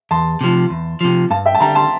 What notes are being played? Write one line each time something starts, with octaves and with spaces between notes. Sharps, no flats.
E2 A5 C6
C3 F3
E2
C3 F3
G2 F5 A5
E5 G5
A5
D3 G3 G5 A#5
A5 C6